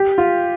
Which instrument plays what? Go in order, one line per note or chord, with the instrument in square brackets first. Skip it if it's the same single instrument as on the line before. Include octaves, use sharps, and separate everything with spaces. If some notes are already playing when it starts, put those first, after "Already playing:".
Already playing: [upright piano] G4
F4